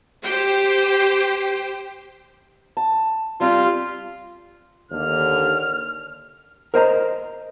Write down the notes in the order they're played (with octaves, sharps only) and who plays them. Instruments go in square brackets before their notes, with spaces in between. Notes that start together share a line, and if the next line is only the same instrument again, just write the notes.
[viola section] G4 C5 G5
[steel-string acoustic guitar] A5
[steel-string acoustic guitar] G3 C4 G4 [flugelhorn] F4
[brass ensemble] D#2 D3 [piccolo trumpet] F6
[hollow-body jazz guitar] A#4 C5 D#5 A#5